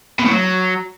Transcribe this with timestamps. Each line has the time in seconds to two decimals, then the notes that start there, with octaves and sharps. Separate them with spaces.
0.19 B2
0.26 A2
0.32 F#3